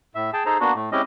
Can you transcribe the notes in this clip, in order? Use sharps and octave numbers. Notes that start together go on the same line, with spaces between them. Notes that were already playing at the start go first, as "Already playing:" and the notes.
A2 E5
G#4 G5 A5
D#4 G#4 A4 C5 A#5
A#3 B3 D4 F#4
A2 A3
G#3 C4 C#4 E4 G4 D#5